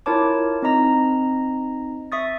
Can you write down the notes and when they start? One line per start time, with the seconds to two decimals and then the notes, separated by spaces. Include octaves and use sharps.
0.06 E4 F4 A#4 C#5 A5 D6
0.62 C4 D#4 D#5 A#5 A#6
2.12 E5 C#6 D#6 A6